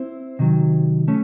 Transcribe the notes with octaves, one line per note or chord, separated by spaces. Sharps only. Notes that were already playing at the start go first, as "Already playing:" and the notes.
Already playing: C4 E4 C5
C3 D#3 F#3
A3 C#4